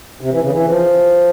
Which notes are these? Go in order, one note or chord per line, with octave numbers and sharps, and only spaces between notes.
C3
E3
C#3
E3
F3